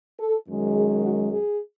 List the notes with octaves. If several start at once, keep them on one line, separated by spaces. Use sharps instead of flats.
A4
F#2 D#3 G#3
G#4
F#4
G#4